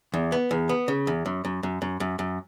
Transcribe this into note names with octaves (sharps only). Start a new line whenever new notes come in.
E2
B3
E2
B3
C#3
E2
F#2
F#2
F#2
F#2
F#2
F#2